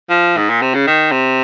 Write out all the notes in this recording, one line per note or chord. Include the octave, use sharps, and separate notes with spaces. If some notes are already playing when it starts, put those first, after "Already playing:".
F3
G#2
A#2
C3
C#3
D#3
C3